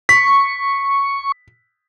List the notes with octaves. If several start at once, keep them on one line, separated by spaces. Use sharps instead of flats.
C#6 B6